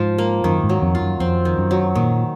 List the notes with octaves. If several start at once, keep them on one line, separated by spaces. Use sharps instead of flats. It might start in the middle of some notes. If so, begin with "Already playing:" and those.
Already playing: G#2 F3 F4
A#3
F#2 D#3
G#2
F#3
F2
F4
F#2
F2 C4
D#3
F#2
F#3
A#2 D#3